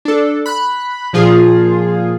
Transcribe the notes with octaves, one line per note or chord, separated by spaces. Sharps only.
D4 A4
B5 F#6
A#2 F3 F4 G#4